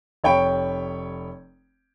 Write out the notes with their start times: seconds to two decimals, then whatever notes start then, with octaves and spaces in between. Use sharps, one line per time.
0.24 F1 C#5 G5 B5 D7